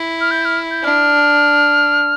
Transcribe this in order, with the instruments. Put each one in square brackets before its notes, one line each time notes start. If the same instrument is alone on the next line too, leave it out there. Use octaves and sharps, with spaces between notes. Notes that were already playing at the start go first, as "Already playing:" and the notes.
Already playing: [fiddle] E4
[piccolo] F6
G6
F6
G6
[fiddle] D4 [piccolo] F6